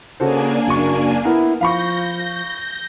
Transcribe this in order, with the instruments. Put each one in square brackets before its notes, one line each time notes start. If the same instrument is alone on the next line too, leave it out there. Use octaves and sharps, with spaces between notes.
[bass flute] C#3 [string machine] A#3 D4 G#5 [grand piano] F#4 A4 C5
[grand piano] F#1 C#6 [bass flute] F#4
[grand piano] B3 A#4 [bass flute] E4
[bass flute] F3 [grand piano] F5 B5 C#6 [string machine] G6 A#6